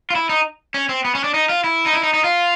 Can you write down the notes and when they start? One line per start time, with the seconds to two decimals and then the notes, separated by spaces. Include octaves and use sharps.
0.10 F4
0.15 E4
0.29 D#4
0.74 C#4
0.89 C4
1.05 B3
1.15 C#4
1.24 D4
1.34 D#4
1.49 F4
1.64 E4
1.86 D#4
1.94 E4
2.03 D#4
2.14 D#4
2.24 F4